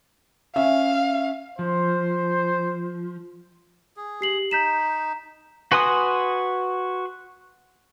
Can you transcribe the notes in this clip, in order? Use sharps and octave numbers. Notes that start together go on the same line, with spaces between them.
C#4 E5 F5
F3 C5
G#4
G4 C7 F#7
D#4 G6 B6 E7
F#4 B4 G#5 C6 D#6